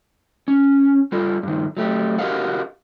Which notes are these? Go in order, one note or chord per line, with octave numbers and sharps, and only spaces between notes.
C#4
G3 F4 A4
G2 D#3
F#3 A3 G4
F#4 G4 A#4 D#5 F5 F#5